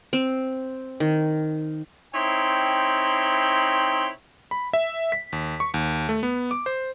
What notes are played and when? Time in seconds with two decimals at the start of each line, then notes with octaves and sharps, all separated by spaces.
0.13 C4
1.00 D#3
2.15 C4 D#4 E4 C#5 G5 C6
4.51 B5
4.73 E5
5.12 B6
5.33 D#2
5.60 C#6
5.74 D#2
6.09 A3
6.23 B3
6.51 D6
6.66 C5